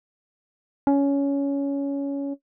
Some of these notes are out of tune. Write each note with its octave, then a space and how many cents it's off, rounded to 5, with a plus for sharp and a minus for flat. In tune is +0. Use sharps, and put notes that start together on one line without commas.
C#4 +15